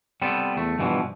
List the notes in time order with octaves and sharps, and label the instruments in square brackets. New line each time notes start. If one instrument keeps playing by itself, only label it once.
[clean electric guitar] G3 B3 C4 A4
E2 A3
G2 B2 E3 F3